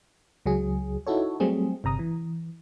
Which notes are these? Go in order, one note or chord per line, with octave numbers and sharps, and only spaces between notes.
C#2 F#3 G#4
D#4 E4 F#4 A4 C#5
F#3 G3 A3 C4 G#4
G1 C3 A#5 D#6
E3